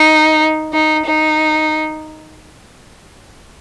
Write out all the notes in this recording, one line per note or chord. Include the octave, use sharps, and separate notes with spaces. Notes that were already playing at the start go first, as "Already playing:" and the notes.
Already playing: D#4
D#4
D#4